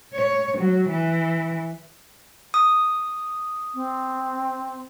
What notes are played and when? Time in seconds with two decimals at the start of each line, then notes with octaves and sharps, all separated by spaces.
0.14 C#5
0.57 F#3
0.89 E3
2.54 D#6
3.75 C4